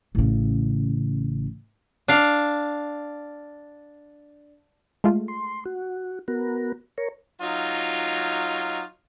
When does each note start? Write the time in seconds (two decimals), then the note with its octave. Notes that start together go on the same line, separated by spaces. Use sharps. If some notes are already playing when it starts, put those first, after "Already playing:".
0.15 A1 C#3
2.08 D4 F5
5.04 G#3 A3 F4
5.28 C6
5.66 F#4
6.28 B3 F#4 A#4
6.98 A#4 C#5
7.41 F#3 D#4 F4